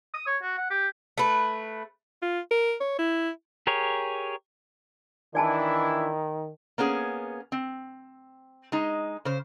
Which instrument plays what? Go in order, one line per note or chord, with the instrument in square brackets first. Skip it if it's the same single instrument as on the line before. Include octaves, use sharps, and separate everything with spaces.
[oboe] D#6
C#5
F#4
F#5
G4
[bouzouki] A3 B4
[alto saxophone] F4
A#4
C#5
E4
[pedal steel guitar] G4 G#4 A#4 C#5
[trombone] D#3 [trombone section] E3 D4 E4 [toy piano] D5 G#5 A5
[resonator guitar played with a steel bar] A#3 B3 C#4 G#4
C4
G#3 D#4
C#3 C5